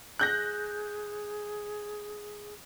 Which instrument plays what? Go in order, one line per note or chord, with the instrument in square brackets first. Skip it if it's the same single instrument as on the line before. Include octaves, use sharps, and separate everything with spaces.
[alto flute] G#4 [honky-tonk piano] F#6 G6 A#6